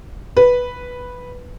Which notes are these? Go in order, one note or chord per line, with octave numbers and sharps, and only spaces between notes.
B4